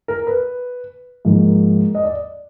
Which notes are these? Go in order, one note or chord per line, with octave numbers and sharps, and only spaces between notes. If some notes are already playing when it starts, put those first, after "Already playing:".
A#4
B4
G#2 F3 A#3
D#5
D5